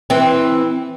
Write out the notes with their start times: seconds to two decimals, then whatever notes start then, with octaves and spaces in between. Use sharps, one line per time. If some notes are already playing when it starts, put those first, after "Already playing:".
0.10 E3 C4